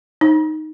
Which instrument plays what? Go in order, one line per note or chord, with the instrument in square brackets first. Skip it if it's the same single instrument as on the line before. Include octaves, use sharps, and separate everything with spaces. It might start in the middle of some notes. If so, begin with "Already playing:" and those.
[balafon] D#4